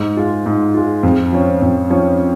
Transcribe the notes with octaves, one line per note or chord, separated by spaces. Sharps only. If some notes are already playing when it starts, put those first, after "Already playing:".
Already playing: G#2
G#3 F4
G#2
G#3 F4
F2
F3 C#4
F2
F3 C#4